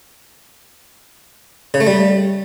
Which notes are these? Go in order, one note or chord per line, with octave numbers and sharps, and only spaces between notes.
C#3
A3
G3